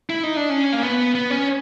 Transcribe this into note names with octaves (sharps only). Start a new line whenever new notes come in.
E4
D#4
D4
C#4
A#3
B3
B3
C#4